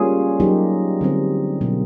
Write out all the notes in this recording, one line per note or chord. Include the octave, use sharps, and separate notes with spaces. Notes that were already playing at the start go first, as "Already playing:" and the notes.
Already playing: G3 A#3 C#4 F4 G#4
F#3 A#3 D#4 G4
D3 G3 C4
B2 F#3 A#3